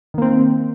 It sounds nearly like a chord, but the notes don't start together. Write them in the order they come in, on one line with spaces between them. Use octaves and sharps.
D#3 A#3 C4